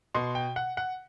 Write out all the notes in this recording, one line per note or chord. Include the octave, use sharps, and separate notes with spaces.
B2 C6
G5
F#5
F#5